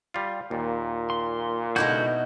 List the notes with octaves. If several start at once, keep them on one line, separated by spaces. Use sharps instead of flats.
G3 F4
D#2 A#2
C6
C#2 B2 D3 D#4 E4 F#4 G6